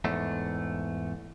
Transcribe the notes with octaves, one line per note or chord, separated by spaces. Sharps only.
E2 G#2 A3